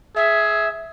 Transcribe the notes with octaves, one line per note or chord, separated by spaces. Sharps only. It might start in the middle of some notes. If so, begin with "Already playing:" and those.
G#4 E5